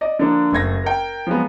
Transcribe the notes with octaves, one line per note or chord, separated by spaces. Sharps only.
D5 D#5
D3 F3 A#3 D4
F#1 A3 G#6 A#6
A#4 G5
F3 F#3 G#3 B3